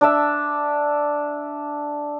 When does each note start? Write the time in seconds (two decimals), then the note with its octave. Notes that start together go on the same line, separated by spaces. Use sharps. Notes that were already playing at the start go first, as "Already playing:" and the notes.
0.01 D4 D5 E5